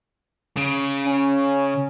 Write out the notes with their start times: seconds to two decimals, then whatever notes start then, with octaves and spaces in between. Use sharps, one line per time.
0.57 C#3
1.06 C#4